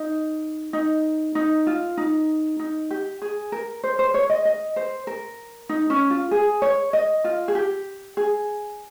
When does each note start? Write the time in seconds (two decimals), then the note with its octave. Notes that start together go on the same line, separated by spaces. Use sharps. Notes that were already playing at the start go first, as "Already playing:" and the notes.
Already playing: D#4
0.73 D#4
1.35 D#4
1.67 F4
1.97 D#4
2.59 D#4
2.91 G4
3.22 G#4
3.52 A#4
3.84 C5
3.99 C5
4.14 C#5
4.30 D#5
4.45 D#5
4.76 C5
5.07 A#4
5.69 D#4
5.90 C#4
6.10 F4
6.31 G#4
6.62 C#5
6.93 D#5
7.24 F4
7.48 G#4
7.55 G4
8.17 G#4